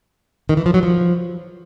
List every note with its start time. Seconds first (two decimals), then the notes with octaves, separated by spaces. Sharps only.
0.49 D#3
0.57 E3
0.66 F3
0.74 F#3
0.83 F3